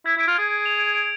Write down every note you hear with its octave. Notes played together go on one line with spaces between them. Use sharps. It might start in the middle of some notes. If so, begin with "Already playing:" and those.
E4 G#6
E4
D7
F4
G#4 G#6
D7
F7
D7
D7